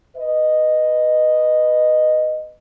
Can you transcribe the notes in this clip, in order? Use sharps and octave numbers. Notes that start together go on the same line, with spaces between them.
B4 D#5